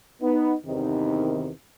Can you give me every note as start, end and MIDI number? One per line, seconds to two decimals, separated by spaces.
0.22 0.54 59
0.22 0.54 63
0.66 1.49 40
0.66 1.49 43
0.66 1.49 48
0.66 1.49 51